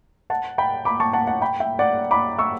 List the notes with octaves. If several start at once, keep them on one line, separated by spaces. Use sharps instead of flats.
F#5 A5
G5 B5
B5 D6
A5 C#6
F#5 A5
F#5 A5
G5 B5
E5 G5
D5 F#5
B5 D6
C#6 E6